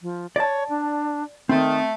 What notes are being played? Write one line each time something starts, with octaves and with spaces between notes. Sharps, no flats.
F3
C#5 D5 A5
D4
D#3 A3 C4